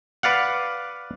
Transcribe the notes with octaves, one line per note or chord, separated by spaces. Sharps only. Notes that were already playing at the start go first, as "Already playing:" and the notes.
B4 D5 F5 F#5